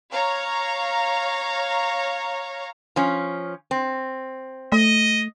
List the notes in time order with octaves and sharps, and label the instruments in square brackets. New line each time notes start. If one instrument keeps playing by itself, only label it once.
[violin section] C#5 F5 A#5
[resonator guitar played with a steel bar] F3 C#4
C4
[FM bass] A3 [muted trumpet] D#5